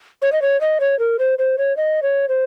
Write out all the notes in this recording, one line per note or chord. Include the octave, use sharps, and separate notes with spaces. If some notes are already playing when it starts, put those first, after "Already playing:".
C#5
D#5
C#5
D#5
C#5
A#4
C5
C5
C#5
D#5
C#5
C5